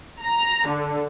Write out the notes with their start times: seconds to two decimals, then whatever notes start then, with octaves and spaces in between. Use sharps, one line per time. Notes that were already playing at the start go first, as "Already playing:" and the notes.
0.24 A#5
0.68 D3